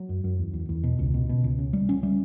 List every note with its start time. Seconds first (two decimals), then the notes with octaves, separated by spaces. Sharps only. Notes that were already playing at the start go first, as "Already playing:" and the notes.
Already playing: F#3
0.09 F#2
0.24 F#2
0.39 E2
0.53 E2
0.69 E2
0.84 B2
0.99 C#2
1.14 B2
1.29 B2
1.44 C#2
1.59 C#3
1.73 G3
1.89 C#4
2.03 G3